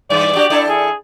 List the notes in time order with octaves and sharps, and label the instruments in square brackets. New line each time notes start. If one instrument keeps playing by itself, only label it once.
[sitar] G2 E3 [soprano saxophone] D5
[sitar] D4 F#4 G4
D4 E4 A4
[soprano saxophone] G#4